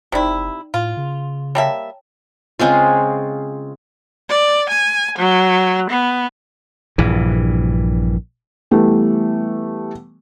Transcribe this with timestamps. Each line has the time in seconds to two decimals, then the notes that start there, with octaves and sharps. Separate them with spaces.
0.12 F#1 C3 D#4 E4 D5 G5
0.74 A2 F4
0.97 C#3
1.55 G3 A#3 C#5 E5 G5 A5
2.59 C#3 G#3 C4 F4
4.29 D5
4.69 G#5
5.19 F#3
5.91 B3
6.98 A#1 G2 E3
8.71 E3 G3 A3 B3